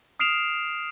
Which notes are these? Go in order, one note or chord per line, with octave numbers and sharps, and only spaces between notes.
D#6 F6 C7 D7 E7 F7